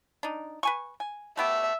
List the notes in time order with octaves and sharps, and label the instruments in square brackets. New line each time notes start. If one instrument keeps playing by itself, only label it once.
[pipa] D4 D#4
B4 G#5 C#6
G#5
[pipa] A3 B3 G4 [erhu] E5